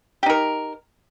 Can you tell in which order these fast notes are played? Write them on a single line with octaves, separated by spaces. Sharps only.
G4 D#4 A#4